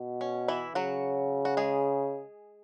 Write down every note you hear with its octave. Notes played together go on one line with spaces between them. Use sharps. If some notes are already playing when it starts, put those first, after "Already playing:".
Already playing: B2
C#4
E3 E4
C#3 F#3 F#4
F#4
G#3 G#4